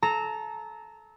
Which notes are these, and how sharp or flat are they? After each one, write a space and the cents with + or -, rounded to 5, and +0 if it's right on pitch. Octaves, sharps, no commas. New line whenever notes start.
A4 -25 A#5 -10